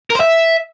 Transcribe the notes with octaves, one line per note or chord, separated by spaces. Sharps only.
A#4
C5
E5